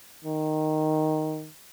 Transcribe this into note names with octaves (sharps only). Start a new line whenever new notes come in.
D#3